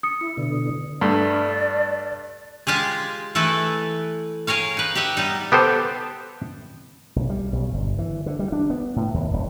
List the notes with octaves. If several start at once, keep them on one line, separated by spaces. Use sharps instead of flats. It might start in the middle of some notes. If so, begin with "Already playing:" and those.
D#6 C#7
E4
B2 D3
G2 A3 D5
G#3 F4 G4 G#4
E3 A3 E4 A4 B4
G#4 A#4 C#5 F5
D#4 B4
G4 D#5 E5 F#5
G3 B3 D#4
B3 G4 A4 C5
B1
G3
B1
G1
E3
D3
G3
D4
B3
A2
D#2
D#1